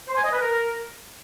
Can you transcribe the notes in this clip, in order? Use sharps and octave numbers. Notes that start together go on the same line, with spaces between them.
C5
G#5
D#5
B4
A#4